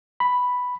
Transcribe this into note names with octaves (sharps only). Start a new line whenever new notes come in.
B5